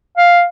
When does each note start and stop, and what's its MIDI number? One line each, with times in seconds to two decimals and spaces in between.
0.17 0.43 77